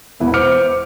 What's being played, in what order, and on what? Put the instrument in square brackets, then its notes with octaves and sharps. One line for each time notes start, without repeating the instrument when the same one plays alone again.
[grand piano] E1 E4 B4 [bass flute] B3
[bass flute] C5 [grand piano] D6 F6 C#7